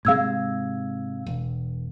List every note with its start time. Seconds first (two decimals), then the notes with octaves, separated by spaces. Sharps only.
0.05 G#2 C3 G#3 F5 E6 G#6
1.26 E1